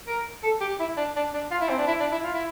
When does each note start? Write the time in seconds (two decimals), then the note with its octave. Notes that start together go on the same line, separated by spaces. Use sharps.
0.07 A#4
0.43 A4
0.61 G4
0.79 E4
0.97 D4
1.16 D4
1.33 D4
1.51 F4
1.61 E4
1.69 C4
1.78 D4
1.87 E4
2.00 D4
2.12 E4
2.23 F4
2.33 E4